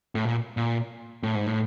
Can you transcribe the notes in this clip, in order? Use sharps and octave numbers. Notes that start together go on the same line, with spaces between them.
A2
A#2
A#2
A2
G#2
A2